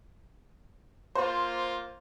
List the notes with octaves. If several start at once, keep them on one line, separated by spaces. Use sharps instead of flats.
A#3 F4 C5